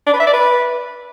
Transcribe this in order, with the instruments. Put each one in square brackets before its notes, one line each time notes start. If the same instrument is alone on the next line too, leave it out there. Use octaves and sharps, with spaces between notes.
[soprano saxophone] D4
B4
E5
D5
B4